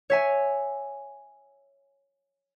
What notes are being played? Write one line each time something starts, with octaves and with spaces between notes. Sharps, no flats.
C#5 E5 G#5